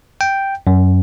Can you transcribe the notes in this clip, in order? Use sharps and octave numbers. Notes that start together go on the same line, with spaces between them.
G5
F#2